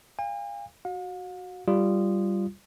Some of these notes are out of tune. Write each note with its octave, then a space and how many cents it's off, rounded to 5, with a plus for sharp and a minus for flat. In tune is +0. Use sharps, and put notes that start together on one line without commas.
F5 +0 G#5 -45
F#4 +0 F5 +45
G3 -5 F4 -15 D#6 -15